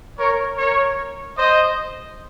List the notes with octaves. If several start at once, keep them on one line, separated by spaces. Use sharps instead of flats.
A#4 C#5
A#4 C#5
C5 D#5